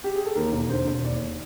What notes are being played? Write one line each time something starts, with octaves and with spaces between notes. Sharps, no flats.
G4
G#4
A4
D#2 A#4
E1
D3 C5
E1
D#2 D5